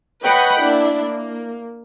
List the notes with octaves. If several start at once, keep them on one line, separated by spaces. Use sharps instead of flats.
B4 C#5 D#5 F#5 G5 B5
A#3 D4 E4
A#3